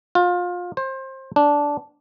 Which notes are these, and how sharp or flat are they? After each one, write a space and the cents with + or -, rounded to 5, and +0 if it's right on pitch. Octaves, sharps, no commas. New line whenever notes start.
F4 +25
C5 +25
D4 -10